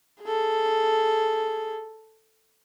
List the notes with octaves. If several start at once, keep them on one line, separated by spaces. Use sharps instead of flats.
G#4 A4